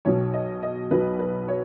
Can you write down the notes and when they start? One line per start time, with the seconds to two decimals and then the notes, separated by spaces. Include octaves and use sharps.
0.05 B1 B2 F#3 C#5
0.33 D#5
0.63 D#5
0.91 B1 B2 F#3 B4
1.19 B4
1.48 C#5